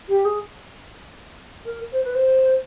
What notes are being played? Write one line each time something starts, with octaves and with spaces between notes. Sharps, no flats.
G4
G#4
A#4
C5
B4
C5